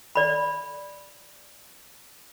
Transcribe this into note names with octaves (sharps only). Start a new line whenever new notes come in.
D5 B5